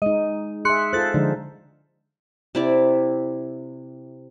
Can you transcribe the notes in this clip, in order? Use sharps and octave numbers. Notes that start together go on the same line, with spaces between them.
G#3 D#4 D#5
G#4 E5 C6 F#6 C#7
F4 A4 C5 F#6 A6
D3 F3 G#3 D#4
C3 E4 D5